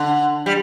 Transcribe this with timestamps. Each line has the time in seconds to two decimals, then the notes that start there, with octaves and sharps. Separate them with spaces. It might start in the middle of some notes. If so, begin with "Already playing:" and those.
Already playing: D3
0.46 G3